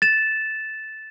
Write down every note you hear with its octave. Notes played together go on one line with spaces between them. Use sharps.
A6 E7